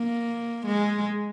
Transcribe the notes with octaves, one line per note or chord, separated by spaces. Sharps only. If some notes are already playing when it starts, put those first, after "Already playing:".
Already playing: A#3
G#3